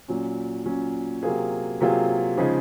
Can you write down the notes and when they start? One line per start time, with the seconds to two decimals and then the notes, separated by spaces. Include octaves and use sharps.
0.08 A#2 F#3 C#4
0.66 A#2 F#3 C#4
1.23 C3 F#3 A#3 F4 G#4
1.81 C3 F#3 A#3 F4 G#4
2.38 C#3 F3 G#3 D#4 G#4